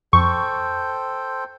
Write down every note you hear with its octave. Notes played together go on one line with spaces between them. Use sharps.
F2 A4 C5 G5 C#6